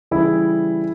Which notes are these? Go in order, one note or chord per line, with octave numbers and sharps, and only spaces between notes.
C#3 E3 G3 E4 G#4